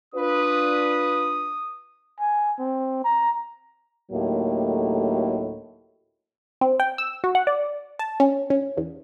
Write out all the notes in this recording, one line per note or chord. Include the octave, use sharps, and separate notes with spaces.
D4 F4 B4 D#6
G#5
C4
A#5
D2 A2 F#3 A#3 D#4 G4
C4
G5
E6
F#4
F#5
D5
A5
C#4
C#4
E2